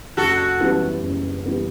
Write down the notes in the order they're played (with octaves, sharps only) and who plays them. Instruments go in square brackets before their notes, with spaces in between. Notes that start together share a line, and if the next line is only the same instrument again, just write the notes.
[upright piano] F#1 [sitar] F#4 A4
[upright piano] F#2 E3 G3 B3
F#1
E3 G3 B3